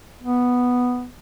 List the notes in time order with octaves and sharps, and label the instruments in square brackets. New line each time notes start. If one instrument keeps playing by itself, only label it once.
[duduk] B3